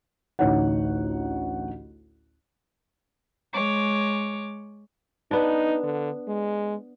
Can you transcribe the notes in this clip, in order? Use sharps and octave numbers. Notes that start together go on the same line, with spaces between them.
A1 D2 D#4 C#5 F#5
G#3 C#5 D6
B3 D4 D#4
D3
G#3